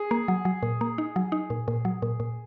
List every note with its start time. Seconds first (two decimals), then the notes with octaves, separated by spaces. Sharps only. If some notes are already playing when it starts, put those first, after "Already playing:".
Already playing: G#4
0.11 A#3
0.28 F#3
0.45 F#3
0.63 A#2
0.81 A#3
0.98 D#4
1.16 F#3
1.32 D#4
1.50 A#2
1.68 A#2
1.85 F#3
2.02 A#2
2.20 A#2